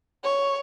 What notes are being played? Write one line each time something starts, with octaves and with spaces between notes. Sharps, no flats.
C#5